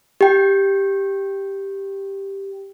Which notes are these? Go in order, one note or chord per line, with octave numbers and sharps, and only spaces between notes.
G4 G5